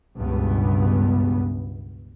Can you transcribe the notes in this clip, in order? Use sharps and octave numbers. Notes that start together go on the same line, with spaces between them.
C#2 G2 B2 B3